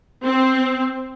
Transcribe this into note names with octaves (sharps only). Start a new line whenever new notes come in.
C4